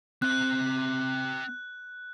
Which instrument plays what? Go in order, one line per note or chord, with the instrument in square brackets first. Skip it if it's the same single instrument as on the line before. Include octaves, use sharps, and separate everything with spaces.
[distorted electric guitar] C4 E5 [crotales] F#6